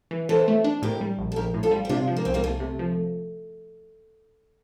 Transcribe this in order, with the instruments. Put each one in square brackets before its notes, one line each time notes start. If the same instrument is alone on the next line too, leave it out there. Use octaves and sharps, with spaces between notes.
[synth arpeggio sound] E3
[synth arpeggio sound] E3 [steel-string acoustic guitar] A4 C5
[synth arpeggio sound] A3
D4
[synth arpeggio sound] A2 [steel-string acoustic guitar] G4 A#4
[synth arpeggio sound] G3
A#1
[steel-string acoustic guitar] A4
[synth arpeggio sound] A#1 [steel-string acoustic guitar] G4 A#4
[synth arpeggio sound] A2
[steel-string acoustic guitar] F4 A4
[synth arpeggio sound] G3
[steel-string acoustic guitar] G4
[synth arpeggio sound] C3 [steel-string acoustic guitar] D4 F4
[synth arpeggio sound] F3
[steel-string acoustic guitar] A#3
[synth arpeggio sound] C2 [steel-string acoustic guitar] C4
[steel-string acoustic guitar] G3 A#3
[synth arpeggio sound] C2 [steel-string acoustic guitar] A3
[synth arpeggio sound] C3
F3